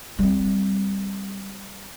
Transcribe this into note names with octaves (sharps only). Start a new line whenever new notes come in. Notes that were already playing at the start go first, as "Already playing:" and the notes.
G3 C4